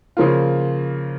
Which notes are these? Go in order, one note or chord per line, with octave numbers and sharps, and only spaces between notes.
C#3 F3 A#3 F4